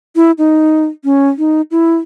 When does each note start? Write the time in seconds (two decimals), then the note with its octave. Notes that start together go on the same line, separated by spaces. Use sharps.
0.16 E4
0.38 D#4
1.04 C#4
1.38 D#4
1.71 E4